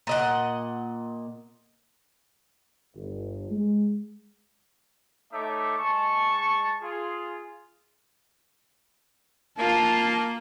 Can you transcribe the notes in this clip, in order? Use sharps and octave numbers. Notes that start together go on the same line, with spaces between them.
A#2 D#5 F#5
G1
G#3
A3 D#4 A4 C#5 E5 D6
G#3 A5 C#6
F4 G#4
A#3 F4 A5